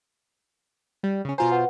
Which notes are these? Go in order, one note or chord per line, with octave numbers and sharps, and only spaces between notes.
G3
C#3 C#4
B2 F4 C5 G#5 A#5
B4 F#5